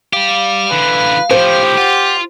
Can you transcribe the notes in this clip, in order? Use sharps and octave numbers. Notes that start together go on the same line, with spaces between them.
G3 G4 F5
D3 E3 B4
A2 F3 G4 C5
F4 F#5